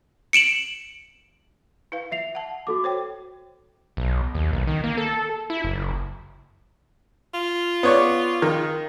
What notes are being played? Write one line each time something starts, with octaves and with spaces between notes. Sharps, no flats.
C#7 D7 E7 F#7
E4 B4 F5
E5 C7 F7
F#5 A5
F#4 A4 D6
C5 C#5 G5
B1
D#2
B1
D#3
A#3
A4
E4
F#1
F4
B3 C#5 D5
D#3